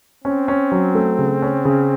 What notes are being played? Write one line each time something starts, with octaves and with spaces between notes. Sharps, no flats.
C4 C#4
C#4
F#3
A3
C#3
C#4
C#3